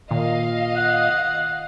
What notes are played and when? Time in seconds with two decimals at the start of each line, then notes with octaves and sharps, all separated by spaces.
0.11 A#2 D#3 D#5 F5
0.76 F#5